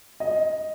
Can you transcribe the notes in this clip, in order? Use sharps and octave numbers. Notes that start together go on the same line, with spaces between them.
D#5